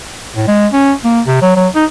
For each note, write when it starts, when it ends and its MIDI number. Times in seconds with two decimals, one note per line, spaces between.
0.36 0.47 45
0.48 0.67 56
0.72 0.93 61
1.04 1.21 58
1.27 1.39 48
1.42 1.52 54
1.56 1.68 54
1.75 1.85 63